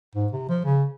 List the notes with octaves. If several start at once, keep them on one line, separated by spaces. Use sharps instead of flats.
G#2
C3
F3
C#3